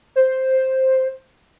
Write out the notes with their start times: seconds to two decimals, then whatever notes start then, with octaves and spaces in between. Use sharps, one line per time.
0.16 C5